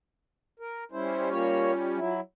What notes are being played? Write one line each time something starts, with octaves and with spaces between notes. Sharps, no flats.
A#4
G3 C#4 E4 C5
A#3 F4 C#5
F#3 E4